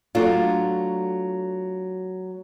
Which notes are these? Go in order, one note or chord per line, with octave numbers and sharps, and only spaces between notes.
F#3 A3 D4 F4